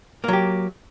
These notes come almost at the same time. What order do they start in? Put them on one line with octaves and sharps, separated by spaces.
A#3 F#3 G4